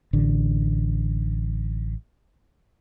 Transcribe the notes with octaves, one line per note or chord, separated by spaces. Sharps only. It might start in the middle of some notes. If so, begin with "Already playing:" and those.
A1 D3